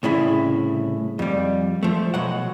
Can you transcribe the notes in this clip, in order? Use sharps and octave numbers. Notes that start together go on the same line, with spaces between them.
C2 A2 C#3 E4
F2 G3
F3 A3
B2 F#3 F#5